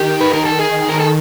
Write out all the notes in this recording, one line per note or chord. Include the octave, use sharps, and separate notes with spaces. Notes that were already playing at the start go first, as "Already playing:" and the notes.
Already playing: D#3 G4
B4
A#4
A4
G#4
A#4
A4